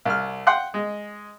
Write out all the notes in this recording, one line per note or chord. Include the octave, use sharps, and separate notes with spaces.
C2 F6
F#5 G5 C6 F#6
G#3